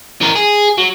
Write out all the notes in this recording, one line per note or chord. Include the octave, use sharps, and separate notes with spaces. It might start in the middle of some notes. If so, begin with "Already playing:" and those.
E3 A#4
G#4
F#3